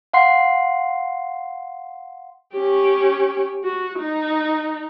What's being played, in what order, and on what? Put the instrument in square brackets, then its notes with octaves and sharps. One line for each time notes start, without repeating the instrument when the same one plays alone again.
[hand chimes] F5 F#5 C6 C7
[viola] C#4 G4
F#4
D#4